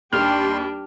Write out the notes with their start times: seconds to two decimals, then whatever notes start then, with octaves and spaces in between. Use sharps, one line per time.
0.13 D#2 G3 D4 G4 G5 C6 F6